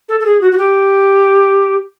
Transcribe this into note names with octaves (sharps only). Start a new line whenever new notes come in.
A4
A4
G#4
F#4
F#4
G4